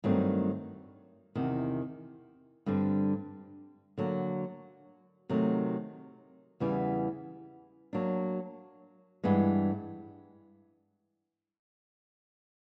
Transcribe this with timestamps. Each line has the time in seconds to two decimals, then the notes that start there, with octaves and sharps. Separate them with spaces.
0.04 G2 D#3 F#3 A3 C4
1.35 E2 C3 D#3
2.66 G2 D3 G3 C4
3.97 D3 F#3 A#3
5.29 C3 D#3 F#3 A3
6.60 E2 C#3 E3 G3 B3
7.93 F#3 A#3 D4
9.23 G2 E3 G#3 B3